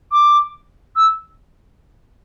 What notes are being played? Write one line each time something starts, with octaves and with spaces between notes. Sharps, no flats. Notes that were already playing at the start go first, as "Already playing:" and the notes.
D6
E6